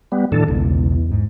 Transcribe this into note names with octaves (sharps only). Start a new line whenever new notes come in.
G3 B3
A2 D#3 F3 D4 A4
B1 E2 C#3 G#3
G#2